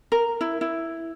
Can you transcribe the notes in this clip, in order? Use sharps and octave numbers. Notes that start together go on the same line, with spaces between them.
A#4
E4
E4